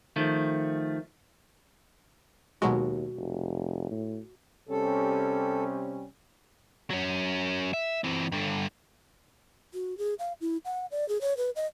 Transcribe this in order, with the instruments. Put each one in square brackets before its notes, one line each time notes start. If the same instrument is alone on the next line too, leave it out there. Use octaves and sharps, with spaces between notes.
[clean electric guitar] D#3 F3 A3
[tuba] D#2 [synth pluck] B2 F#3 G#3 [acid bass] F#4
[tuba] F1
A2
[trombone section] C3 G3 C#4 [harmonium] A4
[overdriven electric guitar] F#3 C#4
E5
E3 C4
G2 D3
[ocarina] F#4
G#4
F5
E4
F#5
D5
G#4
C#5
B4
D#5